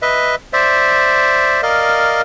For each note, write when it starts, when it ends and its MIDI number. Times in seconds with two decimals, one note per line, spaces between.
0.02 0.35 71
0.02 0.35 75
0.02 0.35 76
0.53 1.61 72
0.53 1.61 74
0.53 1.61 76
1.63 2.22 70
1.63 2.22 74
1.63 2.22 75
1.63 2.22 77